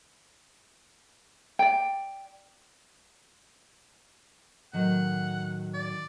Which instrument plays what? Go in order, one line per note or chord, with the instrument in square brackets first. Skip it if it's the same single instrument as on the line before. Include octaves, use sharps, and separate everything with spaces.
[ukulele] D5 G5
[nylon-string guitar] A2 D#3 F#3 [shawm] F#5
[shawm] D5